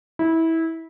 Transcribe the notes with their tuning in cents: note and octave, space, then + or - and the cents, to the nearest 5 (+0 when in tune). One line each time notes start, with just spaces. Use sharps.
E4 -20